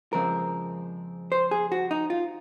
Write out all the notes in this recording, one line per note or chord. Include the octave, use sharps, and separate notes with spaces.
F2 C#3 F3 G#3 C4 A#4
C5
G#4
F#4
D#4
F4